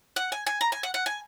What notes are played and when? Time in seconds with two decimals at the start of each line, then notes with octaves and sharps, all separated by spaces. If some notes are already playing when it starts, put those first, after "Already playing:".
0.16 F#5
0.32 G#5
0.47 G#5
0.61 A#5
0.72 G#5
0.83 F#5
0.94 F#5
1.06 G#5